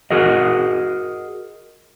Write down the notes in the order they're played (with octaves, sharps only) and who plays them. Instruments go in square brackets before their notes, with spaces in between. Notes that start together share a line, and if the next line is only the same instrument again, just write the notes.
[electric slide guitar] F#4 G#4 A#4 D#5